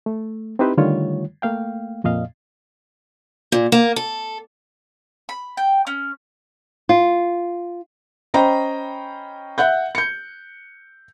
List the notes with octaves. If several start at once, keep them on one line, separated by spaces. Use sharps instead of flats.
A3
C4 D#4 E4 G4 B4 C5
D3 D#3 G3 A3 F4 C#5
A3 A#3 F5 G5
F2 A#2 D#5 F5
A#2
A#3
A4
B5
G5
C#4
F4
C#4 C5 D#5 G5 A#5 B5
E5 F#5 F#6 G6
G6 C#7